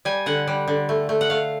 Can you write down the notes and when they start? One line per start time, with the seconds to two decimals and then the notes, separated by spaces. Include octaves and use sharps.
0.05 G3 G#5
0.26 D3 F#5
0.48 G3
0.68 D3
0.89 A3
1.09 A3
1.21 F#5
1.30 A3 F5